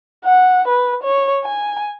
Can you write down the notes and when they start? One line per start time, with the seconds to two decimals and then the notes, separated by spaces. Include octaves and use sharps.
0.25 F#5
0.68 B4
1.04 C#5
1.44 G#5